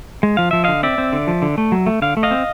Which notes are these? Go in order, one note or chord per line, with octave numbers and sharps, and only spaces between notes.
G#3
F3 F5
F3 E5
D3 D#5 F5
C4 D5 E5
C4
D3
F3
D3
A3
F#3
A3
D3 F5
A3
D#5 F5
C4